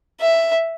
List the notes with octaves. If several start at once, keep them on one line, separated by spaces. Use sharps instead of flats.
E5